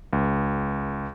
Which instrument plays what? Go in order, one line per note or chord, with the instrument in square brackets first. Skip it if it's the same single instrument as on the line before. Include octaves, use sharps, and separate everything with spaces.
[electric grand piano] C#2